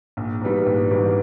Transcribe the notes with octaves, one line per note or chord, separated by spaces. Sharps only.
A#1
G#2 E3 G3 B3
A#1
G#2 E3 G3 B3